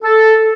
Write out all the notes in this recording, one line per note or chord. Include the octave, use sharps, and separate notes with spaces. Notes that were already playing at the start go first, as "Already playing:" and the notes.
A4